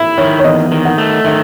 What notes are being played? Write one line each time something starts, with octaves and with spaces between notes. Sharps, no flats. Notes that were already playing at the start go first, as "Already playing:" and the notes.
Already playing: E4 E5
D#3 C#5
C#5
E2 D#5
D#3
F#5
A3
D#3 E5